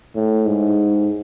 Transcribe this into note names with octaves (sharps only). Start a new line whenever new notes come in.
A2
G#2